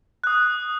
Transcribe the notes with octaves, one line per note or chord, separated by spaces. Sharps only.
D#6 F#6